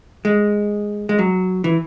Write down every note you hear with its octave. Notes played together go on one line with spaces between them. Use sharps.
G#3
G#3
F#3
E3